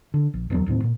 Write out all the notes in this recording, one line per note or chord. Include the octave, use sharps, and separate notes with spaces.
D3
A#1
D1 E2 F#3
D1 D#2 A2 C4
A#2